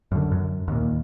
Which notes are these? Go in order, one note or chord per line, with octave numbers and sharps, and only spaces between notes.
F#2 D3
F#2
D#2 A#2